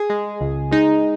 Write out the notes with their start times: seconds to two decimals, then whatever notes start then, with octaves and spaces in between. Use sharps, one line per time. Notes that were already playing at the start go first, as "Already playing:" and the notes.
Already playing: G#4
0.10 G#3
0.41 C#2
0.71 G#3 D#4